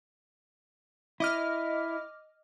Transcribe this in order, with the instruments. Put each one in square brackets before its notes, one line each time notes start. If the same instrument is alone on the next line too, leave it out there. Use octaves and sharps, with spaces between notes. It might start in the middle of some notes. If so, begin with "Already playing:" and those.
[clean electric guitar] E4 [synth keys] D#5 D6 F6